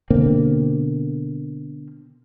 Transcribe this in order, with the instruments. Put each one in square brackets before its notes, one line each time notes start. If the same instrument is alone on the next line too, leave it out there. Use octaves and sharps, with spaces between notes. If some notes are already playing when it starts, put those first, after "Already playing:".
[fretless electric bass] B2 D3 A#3 C4